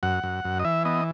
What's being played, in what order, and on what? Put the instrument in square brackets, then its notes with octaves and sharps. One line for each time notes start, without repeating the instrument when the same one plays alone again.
[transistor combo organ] F#2 F#5
F#2
F#2
D#5
E3 E5
B3 D#5